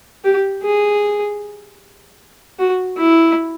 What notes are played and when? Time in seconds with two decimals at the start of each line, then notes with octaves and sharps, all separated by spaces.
0.24 G4
0.63 G#4
2.59 F#4
2.97 E4